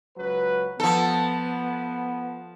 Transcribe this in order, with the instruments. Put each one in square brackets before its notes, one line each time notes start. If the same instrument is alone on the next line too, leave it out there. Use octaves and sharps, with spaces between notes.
[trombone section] C#2 F#3 B4
[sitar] F3 A4 [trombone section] B3